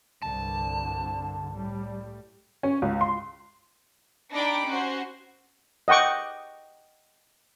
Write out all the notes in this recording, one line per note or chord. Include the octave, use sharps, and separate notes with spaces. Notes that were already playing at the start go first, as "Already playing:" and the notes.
C2 G2 D3 A5
A2 G3
C#4
C#2
C6
D4 D#4 G4 G5 B5 D6
C#4 F#4 C5
D#5 F#5 G5 C#6 D6